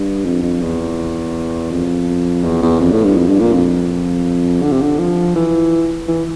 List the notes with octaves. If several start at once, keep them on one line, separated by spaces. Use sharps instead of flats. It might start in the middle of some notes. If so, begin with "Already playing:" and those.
Already playing: G2
F2
F2
E2
F2
E2
E2
F2
A2
G2
F2
G2
A#2
F2
D3
C3
D3
F3
E3
E3